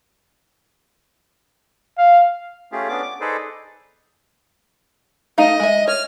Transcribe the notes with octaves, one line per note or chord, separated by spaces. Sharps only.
F5
A3 C#4 F4 G4 G#4
B3 C#4 D4 D5 D6
D6
D#4 G#4 A4 B4 C5 D5
A3 D#4 D#5 F5
G#3 E5
C#5 F6